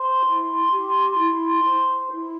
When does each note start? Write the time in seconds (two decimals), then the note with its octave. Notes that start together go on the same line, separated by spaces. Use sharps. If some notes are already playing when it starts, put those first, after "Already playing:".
Already playing: C5 C6
0.25 E4
0.71 G4
1.17 E4
1.65 C5
2.11 E4